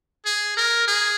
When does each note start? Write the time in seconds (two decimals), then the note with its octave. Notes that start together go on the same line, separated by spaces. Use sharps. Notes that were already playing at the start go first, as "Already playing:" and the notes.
0.26 G#4
0.57 A#4
0.87 G#4